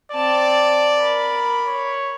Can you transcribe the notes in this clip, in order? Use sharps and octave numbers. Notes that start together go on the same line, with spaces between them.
C4 D5 A5
A#4 B5
C#5